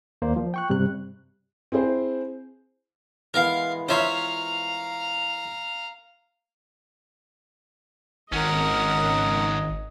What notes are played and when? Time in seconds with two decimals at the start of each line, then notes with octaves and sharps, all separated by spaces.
0.22 D#2 A#3 C5 D5
0.36 F3
0.54 G5 C#6 F#6
0.70 G2 C3 G3 F#6
1.72 C4 E4 G#4 C5
3.34 E3 G#3 B3 A#4 F5
3.89 F4 C5 C#5 E5 F5 A#5
8.32 G#1 G#2 C#4 A#4 D#5 F#5